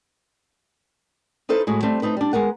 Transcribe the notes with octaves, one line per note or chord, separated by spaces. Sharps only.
D#4 E4 A4 B4 C5 E5
A2 G#3 F#4
G3 A3 C4
A3 C4 D#4 B4
G3 D4
G#3 B3 A#4 F#5